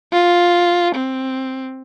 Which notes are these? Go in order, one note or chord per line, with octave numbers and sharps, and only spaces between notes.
F4
C4